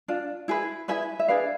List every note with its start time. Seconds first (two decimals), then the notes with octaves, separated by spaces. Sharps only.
0.08 D4 F4
0.48 E4 G#4 B4
0.88 E4 G#4 B4 E5 G#5
1.19 E5
1.28 D4 G#4 B4 D5 F5